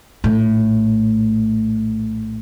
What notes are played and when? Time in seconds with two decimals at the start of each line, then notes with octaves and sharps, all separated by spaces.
0.24 A#1 A2